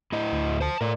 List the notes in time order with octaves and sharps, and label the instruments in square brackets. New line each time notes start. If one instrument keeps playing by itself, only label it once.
[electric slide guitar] A2 E4 D#5
[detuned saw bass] D2
[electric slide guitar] C5 A5
[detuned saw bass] A2 [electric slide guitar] A#4 D5